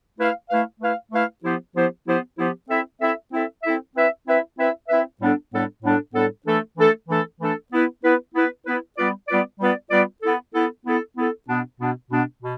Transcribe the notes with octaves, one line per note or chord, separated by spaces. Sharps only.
A3 E4 B4 F5
A3 E4 B4 F5
A3 E4 B4 F5
A3 E4 B4 F5
F3 B3 E4 G4 C5
F3 B3 E4 G4 C5
F3 B3 E4 G4 C5
F3 B3 E4 G4 C5
C4 E4 A4 E5
C4 E4 A4 E5
C4 E4 A4 E5
C4 E4 A4 E5
C4 E4 B4 E5
C4 E4 B4 E5
C4 E4 B4 E5
C4 E4 B4 E5
A2 G3 B3 D4 A4
A2 G3 B3 D4 A4
A2 G3 B3 D4 A4
A2 G3 B3 D4 A4
E3 A3 D4 A4
E3 A3 D4 A4
E3 A3 D4 A4
E3 A3 D4 A4
B3 E4 B4
B3 E4 B4
B3 E4 B4
B3 E4 B4
G3 B3 F4 B4 D5
G3 B3 F4 B4 D5
G3 B3 F4 B4 D5
G3 B3 F4 B4 D5
B3 E4 A4
B3 E4 A4
B3 E4 A4
B3 E4 A4
B2 B3 D4
B2 B3 D4
B2 B3 D4
B2